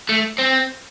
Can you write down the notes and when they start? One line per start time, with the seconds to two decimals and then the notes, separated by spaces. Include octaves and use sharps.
0.09 A3
0.39 C4